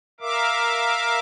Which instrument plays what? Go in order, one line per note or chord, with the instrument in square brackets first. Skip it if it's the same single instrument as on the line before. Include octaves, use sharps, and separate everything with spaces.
[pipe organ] A#4 E5 F5 D6